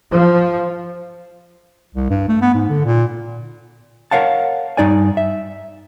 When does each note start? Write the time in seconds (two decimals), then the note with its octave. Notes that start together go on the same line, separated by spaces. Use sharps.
0.11 F3
1.95 C2
2.10 G2
2.28 A3
2.42 B3
2.54 G#2
2.69 D3
2.85 A#2
4.11 A#4 C#5 F5 F#5 A5
4.77 G2 D#4 D5 G#5
5.17 E5